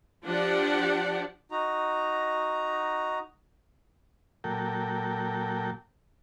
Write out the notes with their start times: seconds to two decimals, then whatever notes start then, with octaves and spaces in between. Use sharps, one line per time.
0.25 F3 D4 G4 D5 F#5
1.51 D#4 F#4 A#5
4.44 A#2 F#3 A4 A#4 G5